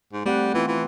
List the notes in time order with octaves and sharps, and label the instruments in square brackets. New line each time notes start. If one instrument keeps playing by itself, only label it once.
[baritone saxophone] G#2
[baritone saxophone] G3 [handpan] A3 C4 F#5
[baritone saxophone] E3 [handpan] B3 F4
[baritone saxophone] E3